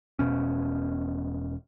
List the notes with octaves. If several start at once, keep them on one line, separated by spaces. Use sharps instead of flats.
E1 B1 B2 C#4